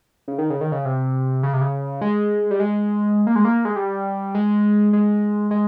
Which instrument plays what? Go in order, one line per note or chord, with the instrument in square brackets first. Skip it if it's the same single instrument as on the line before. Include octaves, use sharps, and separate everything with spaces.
[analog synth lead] C#3
D#3
C#3
D#3
C#3
C3
C#3
C3
C#3
G#3
G3
G#3
A#3
G#3
A#3
G#3
G3
G#3
G#3
G#3